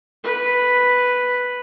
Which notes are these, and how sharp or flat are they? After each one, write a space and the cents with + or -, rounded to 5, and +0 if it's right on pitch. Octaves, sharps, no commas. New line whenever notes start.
B4 +0